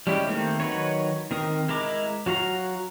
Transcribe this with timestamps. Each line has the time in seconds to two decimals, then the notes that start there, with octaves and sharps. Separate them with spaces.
0.07 G3 G#3 C#4 E4 G4
0.27 D#3 A3 A#3 C4
0.60 D#3 F#3 B4 C#5
1.31 D#3 C4 A#4 D#6
1.68 G#3 E4 A#4 D6
2.26 F#3 F#4 F5 A#5